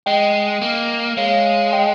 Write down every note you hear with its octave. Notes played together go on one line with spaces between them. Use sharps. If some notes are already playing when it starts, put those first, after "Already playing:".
G#3 D#5 G5
A#3
G#3 C#5 F5
D#5 G5